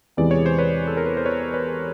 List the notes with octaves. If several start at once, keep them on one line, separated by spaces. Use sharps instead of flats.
E2 C3 E3 G#3 D5
C#5
C5
B4 C#5
A4
A#4
B4
C5
B4 C#5
B4 C#5